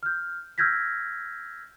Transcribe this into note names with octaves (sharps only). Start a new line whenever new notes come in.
F6 G6
E6 F6 G6 G#6 A#6 B6